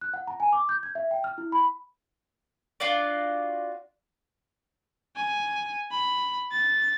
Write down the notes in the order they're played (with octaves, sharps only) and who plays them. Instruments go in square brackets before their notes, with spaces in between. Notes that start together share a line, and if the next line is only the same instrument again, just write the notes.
[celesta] F#6
F#5
A#5
G#5
D6
G6
G#6
E5
G5
F6
E4
B5
[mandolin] D4 F4 F#4 D5
[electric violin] G#5
B5
A6